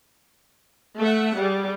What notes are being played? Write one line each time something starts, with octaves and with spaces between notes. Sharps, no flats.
A3 E5 F#5
G3 G#4